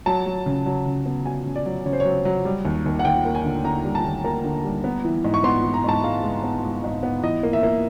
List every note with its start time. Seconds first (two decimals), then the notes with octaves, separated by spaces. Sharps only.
0.06 F#3 A5
0.26 F#3
0.46 C#3
0.66 F#3
0.86 C#3
1.06 B3
1.26 F#3 G#5
1.46 C#3
1.56 D5
1.66 F#3
1.85 C#3 C#5
1.93 C5
2.00 F#3 C#5
2.25 F#3
2.45 G3
2.65 D#2
2.86 D#2
2.99 F#5
3.05 D#2 G5
3.25 A#3
3.35 G#5
3.44 D3
3.65 D3 A#5
3.85 G3
3.95 A5
4.05 D#2
4.24 A#3 A#5
4.44 D3
4.64 G3
4.84 B3
5.04 E3
5.24 G#2
5.34 C#6
5.44 B3 C6
5.64 E3
5.74 A#5
5.84 G#2 A5
6.04 G#3 F5
6.23 G#3
6.43 B3
6.64 G#3
6.84 G#2
7.03 B3
7.23 E3 D#5
7.43 A#3
7.53 E5
7.63 A#3